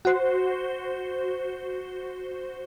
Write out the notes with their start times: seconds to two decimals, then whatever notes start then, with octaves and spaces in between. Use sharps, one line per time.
0.05 F#4 C5